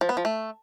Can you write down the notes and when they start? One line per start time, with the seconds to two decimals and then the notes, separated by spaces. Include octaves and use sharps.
0.01 F3
0.09 B3
0.17 F3
0.25 A3